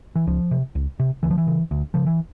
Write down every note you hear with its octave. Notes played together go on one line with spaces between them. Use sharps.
E3
C#2 F3
C3
C#2
C3
D2 E3
F3
E3
C#3
D2
C#3 F3
E3